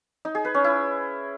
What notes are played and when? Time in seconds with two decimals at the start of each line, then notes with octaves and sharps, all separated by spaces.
0.25 D#4
0.35 G#4
0.45 B4
0.54 C#4
0.64 E4